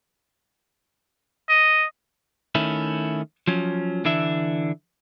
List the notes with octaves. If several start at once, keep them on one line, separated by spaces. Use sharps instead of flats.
D#5
D#3 A3 C#4 E4
F3 F#3 C#4
D3 E3 D4 E5